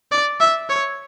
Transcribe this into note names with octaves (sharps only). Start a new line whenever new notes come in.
D5
E5
C#5